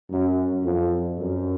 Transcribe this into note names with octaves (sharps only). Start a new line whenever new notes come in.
F#2
F2
F#2